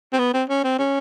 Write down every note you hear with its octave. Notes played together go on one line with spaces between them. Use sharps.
C4
B3
C4
C#4
C4
C#4